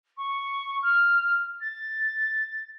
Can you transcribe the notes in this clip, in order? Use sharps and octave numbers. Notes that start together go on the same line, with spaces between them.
C#6
F6
A6